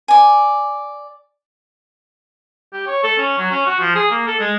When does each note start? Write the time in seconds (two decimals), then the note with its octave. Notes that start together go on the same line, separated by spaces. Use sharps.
0.08 D5 G#5
2.73 G4
2.87 C#5
3.04 A4
3.18 C#4
3.39 F#3
3.51 C#4
3.66 F#4
3.80 F3
3.95 G#4
4.11 A#3
4.27 A4
4.40 G#3